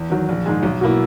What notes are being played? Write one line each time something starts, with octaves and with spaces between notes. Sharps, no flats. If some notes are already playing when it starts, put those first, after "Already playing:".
Already playing: E2
D#3 F#3
A#1
G#2 D#3 G#3
B1
B2 A#3 E4